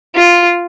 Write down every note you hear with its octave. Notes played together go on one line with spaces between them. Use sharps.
F4